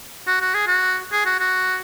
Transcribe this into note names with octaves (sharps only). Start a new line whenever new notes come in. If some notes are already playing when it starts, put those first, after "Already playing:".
F#4
F#4
G#4
F#4
G#4
F#4
F#4